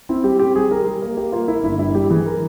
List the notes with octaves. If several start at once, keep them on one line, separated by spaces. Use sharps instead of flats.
C4 E4
G3 G4
C4 G4
G3 G#4
G3 A#4
G3
A#3
A#3 G4
A#3 F4
A#3 E4
G1 E4
G2 E4
G3 G4
E3 G#4
A#4